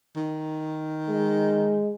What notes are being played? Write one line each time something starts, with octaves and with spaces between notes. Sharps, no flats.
D#3
G#3